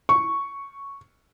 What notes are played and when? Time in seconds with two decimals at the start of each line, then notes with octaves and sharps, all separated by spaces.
0.09 C#6